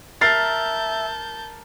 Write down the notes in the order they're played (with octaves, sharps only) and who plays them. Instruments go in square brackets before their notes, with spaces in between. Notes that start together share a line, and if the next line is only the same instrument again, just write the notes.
[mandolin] A#4 [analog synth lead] E5 [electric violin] A5 G6 [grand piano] A6 C7